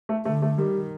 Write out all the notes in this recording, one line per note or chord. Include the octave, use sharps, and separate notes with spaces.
A3
D3 A3
A3
D#3 G3